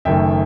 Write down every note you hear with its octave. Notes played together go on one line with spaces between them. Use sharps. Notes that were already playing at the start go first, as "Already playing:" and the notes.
F#1 F#2 D#3 A3 E5 G5